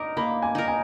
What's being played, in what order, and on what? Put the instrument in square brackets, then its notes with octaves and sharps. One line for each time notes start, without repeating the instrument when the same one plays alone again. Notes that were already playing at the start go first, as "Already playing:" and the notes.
Already playing: [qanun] D#4 A#4 [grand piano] D6
[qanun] A#3 [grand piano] B5
[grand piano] G#5
[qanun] D#4 A#4
[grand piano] G#5